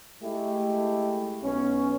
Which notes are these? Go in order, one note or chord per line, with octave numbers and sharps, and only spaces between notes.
G#3 A3 E4 G4
B1 B3 C#4